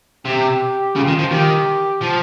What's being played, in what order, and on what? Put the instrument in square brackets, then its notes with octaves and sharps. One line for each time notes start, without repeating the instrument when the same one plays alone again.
[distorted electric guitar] C3 [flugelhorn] G4
[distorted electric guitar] C#3 [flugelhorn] F4
[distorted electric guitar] D#3
F3
[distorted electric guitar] D#3 [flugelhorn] G4
[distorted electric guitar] F3